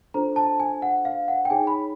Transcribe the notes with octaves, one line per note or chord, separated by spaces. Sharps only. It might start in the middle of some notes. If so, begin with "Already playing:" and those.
D4 F4 A4 C5 A#5
A5
G#5
F#5
F5
F#5
G5
D#4 G#4 C#5 G#5
B5